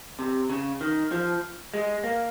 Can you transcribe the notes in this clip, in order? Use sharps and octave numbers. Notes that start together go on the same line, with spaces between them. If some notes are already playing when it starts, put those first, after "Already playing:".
C3
C#3
D#3
F3
G#3
A#3